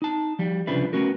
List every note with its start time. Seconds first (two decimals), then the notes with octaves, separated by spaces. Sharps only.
0.02 D#4 A5
0.39 F3 G3
0.67 C2 C#3 F3 D4 B4 E5
0.93 A3 B3 C#4 F#4 A#4